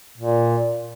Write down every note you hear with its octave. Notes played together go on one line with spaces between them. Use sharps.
A#2